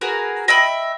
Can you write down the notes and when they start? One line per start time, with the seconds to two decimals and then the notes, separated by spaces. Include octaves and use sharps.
0.01 F#4 G#4 A#4 B4
0.48 D#5 E5 G5 B5